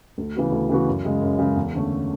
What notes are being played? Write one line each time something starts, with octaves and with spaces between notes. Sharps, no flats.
D2
C#3 E3 B3 F#4
D2
C#3 E3 B3 F#4
F#2
C#3 G#3
F#2
C#3 G#3
E2
D3 A3 C#4